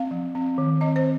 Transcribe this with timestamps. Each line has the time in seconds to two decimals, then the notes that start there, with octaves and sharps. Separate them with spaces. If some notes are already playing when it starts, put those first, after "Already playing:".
Already playing: C4 F5
0.11 F3
0.35 C4
0.58 D#3
0.81 C4 D#5
0.96 C5